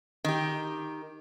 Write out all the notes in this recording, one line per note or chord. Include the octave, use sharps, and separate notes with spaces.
D#3 G4